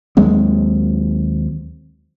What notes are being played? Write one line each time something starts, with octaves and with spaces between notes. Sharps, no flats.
D#2 F#3 G#3 C4